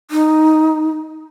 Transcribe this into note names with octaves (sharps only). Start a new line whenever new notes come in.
D#4